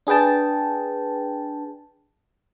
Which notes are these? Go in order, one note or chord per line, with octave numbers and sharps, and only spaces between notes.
D4 G#4 B4 G5 A5